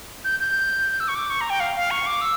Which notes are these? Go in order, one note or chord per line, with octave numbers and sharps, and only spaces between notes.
G6
G6
E6
C#6
D6
C#6
A#5
G5
F5
F5
C#6
D6
E6